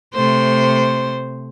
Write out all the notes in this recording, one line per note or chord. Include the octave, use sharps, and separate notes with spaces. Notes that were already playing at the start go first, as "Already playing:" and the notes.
C3 A3 C5